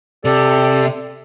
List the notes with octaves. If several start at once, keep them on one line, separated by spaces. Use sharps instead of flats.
C3 G4 A4 D5